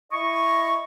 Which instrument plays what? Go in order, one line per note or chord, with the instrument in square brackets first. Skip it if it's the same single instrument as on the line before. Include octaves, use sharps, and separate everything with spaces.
[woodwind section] E4 D#5 C#6